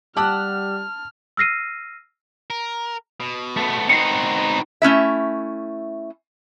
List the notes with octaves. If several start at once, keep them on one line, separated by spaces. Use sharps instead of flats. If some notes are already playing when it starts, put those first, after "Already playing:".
G3 G4 F#5 A5 E6 F6
E6 F6 A#6 C7 D#7
A#4
B2
A3 B3
B3 C4 D#4 F#4 C7 C#7
A3 C#4 E4 E5